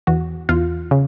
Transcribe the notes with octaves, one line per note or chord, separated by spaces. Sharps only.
E2 F#4
E2 F4
C#3